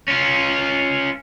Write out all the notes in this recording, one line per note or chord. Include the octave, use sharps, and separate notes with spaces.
C#4 F4